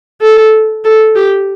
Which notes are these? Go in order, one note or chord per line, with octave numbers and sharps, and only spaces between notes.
A4
A4
G4